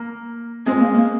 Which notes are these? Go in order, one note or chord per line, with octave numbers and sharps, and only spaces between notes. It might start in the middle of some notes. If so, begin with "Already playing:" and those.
Already playing: A#3
G#3 C4
A#3
A#3